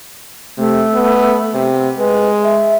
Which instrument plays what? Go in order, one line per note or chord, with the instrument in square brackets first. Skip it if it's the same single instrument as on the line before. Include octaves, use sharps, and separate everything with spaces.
[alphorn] C3 [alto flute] A3
[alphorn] B3
C3
[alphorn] G#3 [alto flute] B4
[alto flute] E5